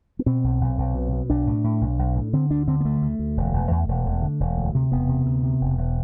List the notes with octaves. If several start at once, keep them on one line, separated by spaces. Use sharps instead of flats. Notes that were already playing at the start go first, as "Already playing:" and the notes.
B3
B2 C4
B1
B1
B1
B2
B2
B1 D4
A2
A2
B1
B1
A2
D3 C4
D2 D4
D3 C4
B3
D2 A3
D2
D2
E1
E1
E2
E1
E1
D3
E1
D2
C3
E1 B3
C3
D2
C3
E1
E1